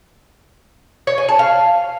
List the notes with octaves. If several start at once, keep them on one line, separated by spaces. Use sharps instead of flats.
C#5
G#5
A5
F5